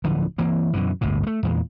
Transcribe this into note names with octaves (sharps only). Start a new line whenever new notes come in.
D1 D3 E3 F3
E3 A#3 C4
F#2 B2 D3 E3
G1 D2 A2 C3
G3 A3
E2 A#2 E3 G#3